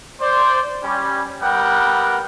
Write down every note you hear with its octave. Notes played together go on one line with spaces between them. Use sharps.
C5 D5
G3 C#4
G3 B3 A#4 F#5 G5